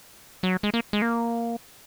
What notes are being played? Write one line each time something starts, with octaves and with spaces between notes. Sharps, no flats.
F#3
G#3
A#3
G#3
A#3